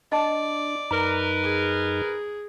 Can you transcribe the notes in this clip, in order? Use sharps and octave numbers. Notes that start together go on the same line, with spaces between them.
D4 D5 D#5 A5
F#2 D#4 A#4 B4 A#5
G#4